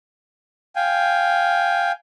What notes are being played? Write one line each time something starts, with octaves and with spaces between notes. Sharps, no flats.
F5 G5 G#5